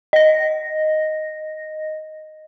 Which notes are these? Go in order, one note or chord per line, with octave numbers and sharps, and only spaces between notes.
D#5 A#6